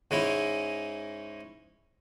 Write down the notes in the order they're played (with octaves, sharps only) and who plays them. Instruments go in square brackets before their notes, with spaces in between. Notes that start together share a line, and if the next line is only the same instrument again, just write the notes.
[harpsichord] G#2 G#3 C#4 E4